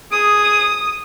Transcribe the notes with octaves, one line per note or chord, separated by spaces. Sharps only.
G#4 D#6